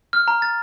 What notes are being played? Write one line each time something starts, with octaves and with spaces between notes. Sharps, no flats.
F6
A#5
A6